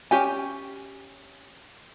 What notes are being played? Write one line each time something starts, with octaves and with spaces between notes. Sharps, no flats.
C#4 G4 G#5